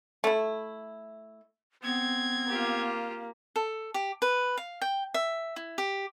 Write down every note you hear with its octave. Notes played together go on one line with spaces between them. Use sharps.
A3 E4
B3 C4 G#6
A#3 F4 G4
A4
G4
B4
F5
G5
E5
E4
G4